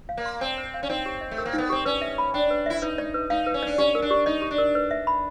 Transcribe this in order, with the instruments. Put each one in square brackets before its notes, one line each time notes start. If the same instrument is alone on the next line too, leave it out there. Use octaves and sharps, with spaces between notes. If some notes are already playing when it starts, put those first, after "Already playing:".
[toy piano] F5
[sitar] A#3
[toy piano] C6
[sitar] C4 [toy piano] A5
[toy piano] C5
F5
[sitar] C#4
[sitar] C4 [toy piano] D#4
[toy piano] G4
D#5
[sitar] A3
[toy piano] A#4
[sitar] A#3
[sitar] B3 [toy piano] D#4
[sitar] C4 [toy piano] G4
[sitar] C#4 [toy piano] B4
[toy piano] E5
B5
[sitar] D4 [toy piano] G5
[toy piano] B4
[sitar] E4 [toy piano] E5
[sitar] D#4 [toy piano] B4
[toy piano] D5
B4
[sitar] D#4 [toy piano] F5
[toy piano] B4
[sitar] C#4
[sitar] D4 [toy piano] D5
[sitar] C#4 [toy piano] G4
[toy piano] A#4
[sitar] D4
[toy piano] G4
[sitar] D#4 [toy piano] D#5
[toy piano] G4
[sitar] D4
[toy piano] A#4
B4
E5
B5